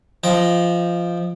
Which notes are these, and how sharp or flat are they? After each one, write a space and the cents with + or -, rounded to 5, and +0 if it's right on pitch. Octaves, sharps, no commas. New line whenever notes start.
F3 -10 D#5 +0 G5 +0